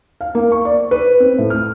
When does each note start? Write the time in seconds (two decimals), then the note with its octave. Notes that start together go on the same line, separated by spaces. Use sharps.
0.21 F5
0.35 A#3
0.52 C#6
0.65 D5
0.91 B4
1.20 C4
1.38 A2
1.50 F6